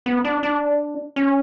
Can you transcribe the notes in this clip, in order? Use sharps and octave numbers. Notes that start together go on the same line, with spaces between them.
B3
D4
D4
C#4